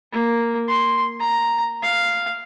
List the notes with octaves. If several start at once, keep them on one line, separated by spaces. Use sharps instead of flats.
A#3
C6
A#5
F5